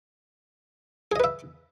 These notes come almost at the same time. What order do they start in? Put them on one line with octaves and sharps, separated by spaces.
G#4 D#5 B4 E5